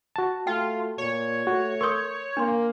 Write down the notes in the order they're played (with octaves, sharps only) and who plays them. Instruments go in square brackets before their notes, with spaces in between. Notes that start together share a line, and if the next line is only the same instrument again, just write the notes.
[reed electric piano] F#4 A5
[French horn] A3 [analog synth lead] F4 [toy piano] G5
[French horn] A#2 [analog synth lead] C#5
[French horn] A3 [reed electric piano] F#4
[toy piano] A#4 C6 D#6 [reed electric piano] C#6 G6
[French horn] A#3 [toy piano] D4 C6